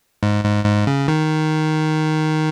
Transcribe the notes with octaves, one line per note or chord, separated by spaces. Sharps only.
G#2
G#2
G#2
C#3
D#3